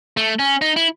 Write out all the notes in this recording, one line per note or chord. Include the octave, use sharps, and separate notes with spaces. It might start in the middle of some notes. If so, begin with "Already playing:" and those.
A3
C#4
D#4
E4